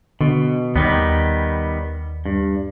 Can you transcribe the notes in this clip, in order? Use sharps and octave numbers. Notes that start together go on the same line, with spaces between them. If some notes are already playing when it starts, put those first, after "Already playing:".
B2 D3
D#2 D#3 G3 B3
G2